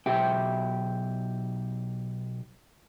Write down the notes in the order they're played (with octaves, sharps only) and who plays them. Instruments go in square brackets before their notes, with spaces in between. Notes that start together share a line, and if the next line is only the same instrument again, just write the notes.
[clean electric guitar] B1 G4 E5 G5